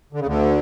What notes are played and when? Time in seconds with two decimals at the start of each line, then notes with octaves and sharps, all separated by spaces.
0.13 D3
0.20 C#3
0.26 D2 D3